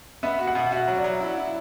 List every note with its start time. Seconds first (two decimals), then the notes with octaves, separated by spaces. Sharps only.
0.23 B3 E5
0.39 F#4
0.47 F#5
0.55 B2
0.72 F#4 E5
0.88 F#3
0.97 D5
1.04 F#3
1.21 E4
1.37 E4